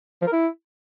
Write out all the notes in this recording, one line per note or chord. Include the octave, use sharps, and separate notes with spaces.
F3
A#4
E4